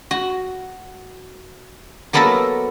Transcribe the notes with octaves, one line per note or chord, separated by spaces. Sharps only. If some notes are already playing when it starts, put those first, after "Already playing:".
F#4
F#3 A#3 B3 A4 A#4 E5